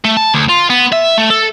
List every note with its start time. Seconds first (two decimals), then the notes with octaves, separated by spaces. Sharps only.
0.05 A3
0.17 A5
0.34 D2
0.49 F4
0.70 B3
0.92 E5
1.18 A3
1.30 A4